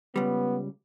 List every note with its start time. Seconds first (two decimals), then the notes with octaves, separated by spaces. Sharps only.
0.16 C#2 G3 B3